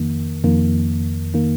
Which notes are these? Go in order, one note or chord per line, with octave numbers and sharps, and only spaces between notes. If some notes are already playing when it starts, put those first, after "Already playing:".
Already playing: F2 D#3 A#3
F2 D#3 A#3
D#3 A#3